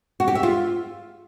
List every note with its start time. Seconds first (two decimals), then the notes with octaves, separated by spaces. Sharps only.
0.20 F#4
0.28 G4
0.35 E5
0.43 F4